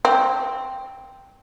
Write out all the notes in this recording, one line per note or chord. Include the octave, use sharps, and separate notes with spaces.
C4